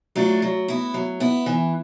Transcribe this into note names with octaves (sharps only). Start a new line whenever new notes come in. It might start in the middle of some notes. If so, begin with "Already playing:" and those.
F#3 A3 D4 F4
F#3
B3 E4
F#3
B3 E4
E3